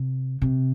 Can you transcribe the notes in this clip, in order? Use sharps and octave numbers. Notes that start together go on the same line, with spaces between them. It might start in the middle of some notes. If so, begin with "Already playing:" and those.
Already playing: C3
C3